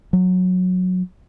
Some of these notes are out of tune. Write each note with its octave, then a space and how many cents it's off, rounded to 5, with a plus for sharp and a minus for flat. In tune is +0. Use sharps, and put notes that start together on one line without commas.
F#3 -15